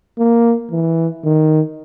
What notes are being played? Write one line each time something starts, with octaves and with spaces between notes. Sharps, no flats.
A#3
E3
D#3